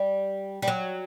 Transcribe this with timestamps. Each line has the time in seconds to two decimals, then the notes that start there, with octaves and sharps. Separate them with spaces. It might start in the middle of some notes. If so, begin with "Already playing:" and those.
Already playing: G3
0.62 G3
0.68 F#3